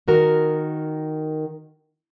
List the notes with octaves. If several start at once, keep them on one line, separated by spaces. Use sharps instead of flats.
D#3 F#4 A#4